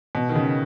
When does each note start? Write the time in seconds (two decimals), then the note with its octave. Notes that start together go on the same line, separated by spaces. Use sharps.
0.15 B2
0.29 D#3
0.35 C#3